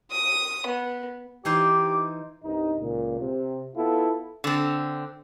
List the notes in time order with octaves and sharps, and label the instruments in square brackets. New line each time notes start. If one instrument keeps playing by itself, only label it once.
[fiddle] D#6
B3
[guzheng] E3 D#4 C5 [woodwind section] G4 D6
[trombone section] C2 G2 D#4
C#2 A#2
C3
B3 E4 F4 A4
[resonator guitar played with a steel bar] D3 C4